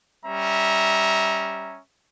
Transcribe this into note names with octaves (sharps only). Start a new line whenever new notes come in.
G3 C#4 E5 A#5